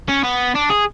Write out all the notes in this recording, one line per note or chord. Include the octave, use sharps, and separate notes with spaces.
C#4
B3
D4
G#4